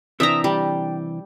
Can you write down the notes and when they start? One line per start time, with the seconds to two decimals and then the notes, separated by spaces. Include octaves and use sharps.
0.20 C3 E3 D4 E5 G5 A#5 D#6
0.44 G3 G5